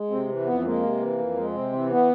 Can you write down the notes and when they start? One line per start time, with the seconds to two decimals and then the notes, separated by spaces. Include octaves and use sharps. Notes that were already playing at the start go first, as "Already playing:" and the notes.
Already playing: G#3
0.11 C3 C4
0.29 E3
0.46 F2 B3
0.65 G#3 A#3
0.83 C3
1.00 E3
1.18 F2
1.37 G#3
1.54 C3 C4
1.73 E3
1.91 B3